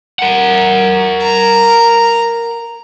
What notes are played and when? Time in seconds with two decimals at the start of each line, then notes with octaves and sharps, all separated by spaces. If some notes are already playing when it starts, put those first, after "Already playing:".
0.19 A#4 F#5
1.23 A#5